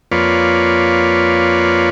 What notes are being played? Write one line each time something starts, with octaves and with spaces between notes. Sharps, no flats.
F2 A#3 F4 B4 C#5 D5